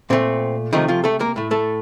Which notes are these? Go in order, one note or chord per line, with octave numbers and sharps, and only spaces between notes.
A#2 A3 C4
C3 D#3 F3 A3 D#4
F3 F4
A3 A4
A#3 A#4
A2 A3
A3 A4